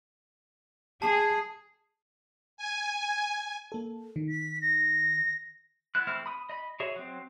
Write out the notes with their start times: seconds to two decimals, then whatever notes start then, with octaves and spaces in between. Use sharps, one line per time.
1.02 G#4 A5 C7
2.57 G#5
3.72 A#3 A4
4.16 D#3
4.29 B6
4.62 A#6
5.95 B3 E4 F#6
6.07 E3 A3 C4 E4 F6
6.26 B5 D#6
6.49 D#5 B5
6.80 F#4 G#4 C#5 E5
6.96 F#3 C4